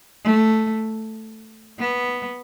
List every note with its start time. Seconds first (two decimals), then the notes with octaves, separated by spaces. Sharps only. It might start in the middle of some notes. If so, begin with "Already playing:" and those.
0.24 A3
1.79 B3